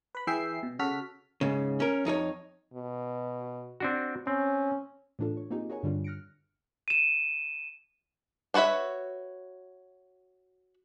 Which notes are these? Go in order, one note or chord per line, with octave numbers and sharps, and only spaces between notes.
B4 B5
E3 E4 G#4 E5 G5 C7
B2
C#3 F#4 A4 F6 B6
G#2 C#3
C#4 A#4
F2 D#4 A4 C#5
B2
C4 D4 F#4
C4 C#4
A2 E3 D4 F4 A4
C#5
A#3 C4 D#4 F4 G4 G#4
F#4 G#4 A#4 C#5 F#5 G#5
G2 D3 G3 D4 F4
F6 F#6 A#6 C#7 D7
D#7 E7
D4 F#4 B4 C#5 E5